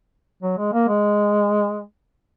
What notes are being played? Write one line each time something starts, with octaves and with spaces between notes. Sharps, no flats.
F#3
G#3
A#3
G#3